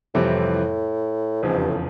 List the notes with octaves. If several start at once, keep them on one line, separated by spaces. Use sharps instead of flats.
F2 A2 C3 E3 G3 C4
F1 E2 G#2 C#3 F3
G2
A2